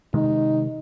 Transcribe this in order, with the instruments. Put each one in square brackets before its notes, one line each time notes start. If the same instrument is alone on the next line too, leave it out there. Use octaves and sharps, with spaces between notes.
[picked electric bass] C3 D#3 G#3 [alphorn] D#4